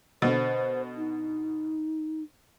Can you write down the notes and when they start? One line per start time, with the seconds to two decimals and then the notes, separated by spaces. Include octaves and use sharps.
0.22 B2 D3 C5
0.97 D#4